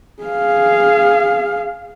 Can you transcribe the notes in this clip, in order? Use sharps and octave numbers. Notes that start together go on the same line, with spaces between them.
G#4 F5